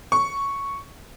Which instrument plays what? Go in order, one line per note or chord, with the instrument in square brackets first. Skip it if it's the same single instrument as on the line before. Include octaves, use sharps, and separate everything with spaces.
[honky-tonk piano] C#6